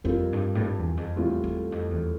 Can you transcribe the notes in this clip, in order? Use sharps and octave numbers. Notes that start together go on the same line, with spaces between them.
F2 G3 C4 F4 A#4
G2
A2
G2
E2
F2
E2 A2 G3 C4 F4
E2
F2
E2